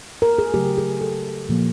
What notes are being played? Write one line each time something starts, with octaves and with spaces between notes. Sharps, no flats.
A#4
G#4
C#3 F#3 A3 G4
G#4
A4
A#2 F3 A#3